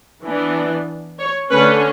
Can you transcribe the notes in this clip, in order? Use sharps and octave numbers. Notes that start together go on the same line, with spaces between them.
E3 B3 D4
C#5
D3 A3 C#4 B4